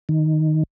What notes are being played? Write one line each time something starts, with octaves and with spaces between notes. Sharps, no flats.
D#3